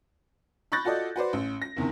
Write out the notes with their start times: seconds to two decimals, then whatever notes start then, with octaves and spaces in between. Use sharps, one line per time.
0.72 B5 C#6 F#6 G6 A6 A#6
0.85 F4 F#4 A4 D5 D#5
1.16 F#4 B4 C5 D5
1.33 A1
1.62 A#6
1.77 F#1 E2 C3 D#3